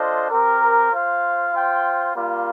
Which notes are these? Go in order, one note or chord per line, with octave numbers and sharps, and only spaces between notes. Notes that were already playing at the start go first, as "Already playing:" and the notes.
Already playing: D4 F4 A4 C5 D#5
C4 G4 A#4
F4 C5 F5
F4 C5 G5
G3 A#3 F4